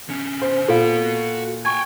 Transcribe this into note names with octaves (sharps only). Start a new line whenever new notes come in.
D3 C#4
C5
A#2 F#4 A4 F5 B5
G5 G#5 C#6 G#6